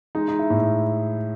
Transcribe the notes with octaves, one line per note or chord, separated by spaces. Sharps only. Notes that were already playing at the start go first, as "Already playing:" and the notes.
G#3 D#4
D#4
E4
A2